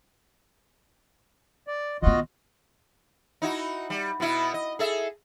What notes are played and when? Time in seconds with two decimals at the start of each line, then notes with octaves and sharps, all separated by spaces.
1.67 D5
2.02 D#3 B3 F4 F#4 D#5
3.42 D#4 E4 F#4
3.90 G3
4.20 B2 B3 E4
4.54 D#5
4.79 G#4 A4 E5